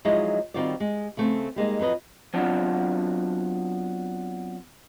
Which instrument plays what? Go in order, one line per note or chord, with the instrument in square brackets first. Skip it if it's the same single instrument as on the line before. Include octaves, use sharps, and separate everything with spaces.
[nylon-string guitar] F3 F#3 G#3 D#4 E4 D#5
D#3 G3 C4 F4 F#4 D5
G#3
C#3 A3 C4
G3 G#3 A#3 D#4
F2 F#3 B4 D#5
[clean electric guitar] F#3 B3 C4 D4 F4 F#5